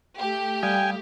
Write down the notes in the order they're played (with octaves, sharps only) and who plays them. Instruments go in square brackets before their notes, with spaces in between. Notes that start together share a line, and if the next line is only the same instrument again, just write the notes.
[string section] A3 G4
[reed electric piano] G3 F5 D#6 [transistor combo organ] G5 G#5